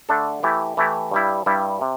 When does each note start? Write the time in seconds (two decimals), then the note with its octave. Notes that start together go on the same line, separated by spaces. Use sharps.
0.09 D3 A3 D4 A4
0.43 E3 A3 E4 G4
0.77 E3 A3 E4 G4
1.11 G2 G3 E4
1.46 G2 G3 E4
1.81 C3